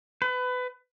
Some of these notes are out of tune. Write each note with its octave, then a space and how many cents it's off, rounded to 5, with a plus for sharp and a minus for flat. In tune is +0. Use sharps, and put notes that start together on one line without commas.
B4 +25